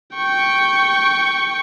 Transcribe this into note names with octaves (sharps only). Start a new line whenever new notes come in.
G5 C#6